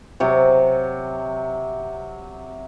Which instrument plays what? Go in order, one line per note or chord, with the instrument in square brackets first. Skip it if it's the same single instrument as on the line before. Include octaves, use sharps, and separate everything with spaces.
[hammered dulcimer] C3 F#3